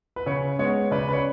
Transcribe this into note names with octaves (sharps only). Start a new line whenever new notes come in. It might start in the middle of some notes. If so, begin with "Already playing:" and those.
B4
C#3 C#5
G#3 B3 C#5
C#3 B4 D5
B4
C#5